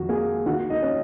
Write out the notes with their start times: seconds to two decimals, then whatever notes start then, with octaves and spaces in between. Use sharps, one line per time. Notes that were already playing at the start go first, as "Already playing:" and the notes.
Already playing: F2 D#3 D#4 F#4
0.09 A#3 G#4 G#5
0.46 D#3 F#4 F#5
0.70 D#4 D#5
0.82 C#4